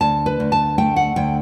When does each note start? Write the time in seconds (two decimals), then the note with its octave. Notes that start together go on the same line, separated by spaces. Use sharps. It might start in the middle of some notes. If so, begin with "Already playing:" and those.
0.01 D2 A5
0.26 B4
0.40 D2
0.52 A5
0.78 A3 G5
0.96 F#5
1.16 D2 G5